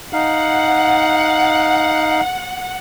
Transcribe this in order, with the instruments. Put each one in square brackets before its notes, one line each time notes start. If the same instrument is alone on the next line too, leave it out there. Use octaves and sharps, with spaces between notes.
[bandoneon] D#4 F5 [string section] F#5